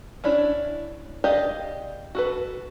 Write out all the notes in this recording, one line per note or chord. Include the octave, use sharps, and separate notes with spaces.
C#4 D4 E4 C#5
G4 G#4 D5 D#5 F5
F#4 A4 B4